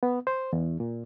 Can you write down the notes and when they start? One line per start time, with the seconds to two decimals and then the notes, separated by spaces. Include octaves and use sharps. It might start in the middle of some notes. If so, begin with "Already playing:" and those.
0.03 B3
0.27 C5
0.53 E2
0.80 A#2